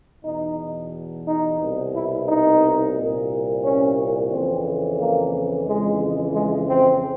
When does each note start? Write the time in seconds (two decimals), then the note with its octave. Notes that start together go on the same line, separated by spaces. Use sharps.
0.25 E2 B2 D#4
1.27 D#4
1.61 C2 B2
1.95 E4
2.28 D#4
2.97 C2 A#2
3.64 C#4
4.32 F2 C#3 E3 C4
5.00 A#3
5.68 F2 C#3 E3 G#3
6.35 G#3
6.70 C4